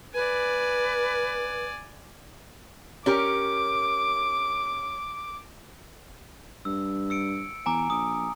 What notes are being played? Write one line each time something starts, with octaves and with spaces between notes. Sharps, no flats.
B4 D5 G#5
C#4 G4 A#4 D6
G2 E6
E6 C#7 D7
E2 G#5 A#5 D6
A#1 D#6